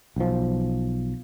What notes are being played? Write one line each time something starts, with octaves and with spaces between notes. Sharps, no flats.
B1 F3